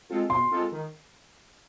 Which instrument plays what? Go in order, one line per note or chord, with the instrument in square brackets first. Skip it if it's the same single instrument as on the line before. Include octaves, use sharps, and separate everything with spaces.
[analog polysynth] G#3 C4 F4 A4
[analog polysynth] B2 [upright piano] C6
[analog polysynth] G#3 C4 F4 A4
D#3